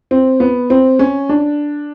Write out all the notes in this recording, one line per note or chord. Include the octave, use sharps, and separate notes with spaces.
C4
B3
C4
C#4
D4